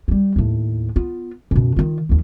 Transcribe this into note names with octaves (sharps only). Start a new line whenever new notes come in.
F#3 G3
D#2 A2
B3 F4
F#2 B2
D#3 F4
D#2 F3